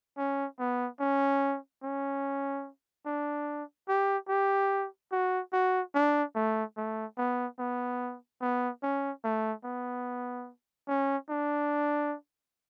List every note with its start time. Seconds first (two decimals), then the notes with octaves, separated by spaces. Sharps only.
0.18 C#4
0.60 B3
1.00 C#4
1.83 C#4
3.06 D4
3.89 G4
4.29 G4
5.12 F#4
5.53 F#4
5.95 D4
6.35 A3
6.77 A3
7.18 B3
7.59 B3
8.41 B3
8.83 C#4
9.24 A3
9.64 B3
10.88 C#4
11.30 D4